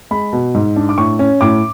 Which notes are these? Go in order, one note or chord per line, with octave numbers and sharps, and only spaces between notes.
G#3 B5
B2
G#2
D4
D6
A2 C#6
C#4
A2 D6